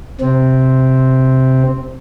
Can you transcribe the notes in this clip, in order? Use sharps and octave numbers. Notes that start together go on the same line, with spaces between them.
C3 C4